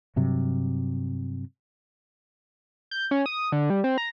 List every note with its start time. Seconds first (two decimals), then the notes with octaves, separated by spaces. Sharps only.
0.16 G2 C3 F#3
2.91 G6
3.11 C#4
3.26 D#6
3.52 D3
3.70 G3
3.84 C4
3.98 A#5